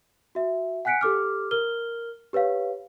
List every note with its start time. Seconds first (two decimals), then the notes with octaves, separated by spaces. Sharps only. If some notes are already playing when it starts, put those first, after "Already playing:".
0.35 F#4 E5
0.85 F#5 G#5 F#6 B6 C#7 D7
1.01 G4 A4 D6 F6
1.51 A#4 F6 G7
2.33 G4 B4 C#5 F5